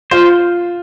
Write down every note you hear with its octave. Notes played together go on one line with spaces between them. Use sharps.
F4 C5